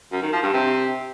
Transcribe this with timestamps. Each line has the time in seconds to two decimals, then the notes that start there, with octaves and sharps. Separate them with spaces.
0.12 F#2
0.22 D#3
0.33 F3
0.43 G2
0.53 C3